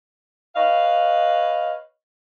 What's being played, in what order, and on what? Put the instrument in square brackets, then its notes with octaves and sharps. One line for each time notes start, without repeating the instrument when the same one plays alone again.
[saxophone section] B4 C#5 D#5 F5